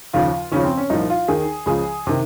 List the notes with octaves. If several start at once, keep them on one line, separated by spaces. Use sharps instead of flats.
D#2 C#3 F3 F4
D#2 C#3 F3 C#4
C4
C#4
C2 A#2 F3 D#4
F4
D#2 D#3 G#4
C#2 C#3 F3 G#4
C3 D#3